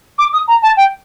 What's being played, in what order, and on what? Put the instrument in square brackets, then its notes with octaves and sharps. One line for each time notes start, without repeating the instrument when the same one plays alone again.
[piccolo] D6
D#6
A#5
A5
G5